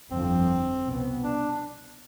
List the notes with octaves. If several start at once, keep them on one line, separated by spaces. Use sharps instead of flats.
G1 F2 D3 F3 C4
C2 B2 B3
D4